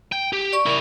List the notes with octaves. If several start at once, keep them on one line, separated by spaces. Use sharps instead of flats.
G5
G4
D5 C#6
E4 A#4